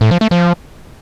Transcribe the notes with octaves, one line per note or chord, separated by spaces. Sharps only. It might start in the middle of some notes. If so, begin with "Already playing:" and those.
A2
F3
A3
F3